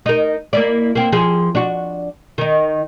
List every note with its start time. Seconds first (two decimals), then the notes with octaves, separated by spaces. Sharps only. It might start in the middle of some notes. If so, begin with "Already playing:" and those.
0.06 D#4 A#4
0.53 A#3 E4 D5
0.95 A#3 C4
1.12 F3 G#4
1.55 D4 F#4
2.38 D#3 D#4